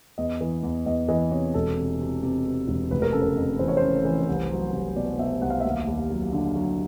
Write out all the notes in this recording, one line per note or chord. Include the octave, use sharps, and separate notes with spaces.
E2 D#5
E3
E2
E2 D#5
E3 D#5
C3 C#5
E1 A4
C3
C3
C3
C3
E1
F1 B4
A#4
C#3 A4
A#4
F2
E3 C5
C#5
C#3 C5
E3
C2
F#3
C2
B2 D5
B2 E5
C2 F#5
F5
E5
D#2 F5
D#2
F#3
D3
F#3